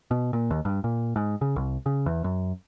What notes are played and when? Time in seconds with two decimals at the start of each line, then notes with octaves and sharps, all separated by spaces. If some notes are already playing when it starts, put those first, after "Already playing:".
0.11 B2
0.33 A#2
0.51 D#2
0.65 G2
0.84 A#2
1.16 G#2
1.41 C#3
1.56 C2
1.86 C#3
2.06 E2
2.24 F#2